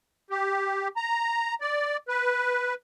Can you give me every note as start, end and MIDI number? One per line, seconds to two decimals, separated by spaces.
0.30 0.88 67
0.97 1.54 82
1.61 1.97 74
2.08 2.74 71